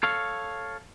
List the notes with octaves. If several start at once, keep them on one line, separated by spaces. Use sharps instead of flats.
A4 C#5 F5